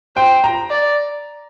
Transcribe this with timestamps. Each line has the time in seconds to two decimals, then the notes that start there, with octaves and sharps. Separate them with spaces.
0.16 C5 G5
0.44 A#5
0.70 D5